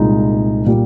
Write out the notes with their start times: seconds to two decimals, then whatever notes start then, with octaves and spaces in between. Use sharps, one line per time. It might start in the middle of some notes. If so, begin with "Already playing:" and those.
Already playing: C2 A#2 G#3 D#4
0.66 A#2 G3